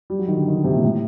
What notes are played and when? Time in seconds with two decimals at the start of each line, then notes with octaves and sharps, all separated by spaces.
0.10 G3
0.19 F#3
0.28 D#3
0.37 D3
0.47 D#3
0.55 D3
0.64 C3
0.74 A#2
0.84 A2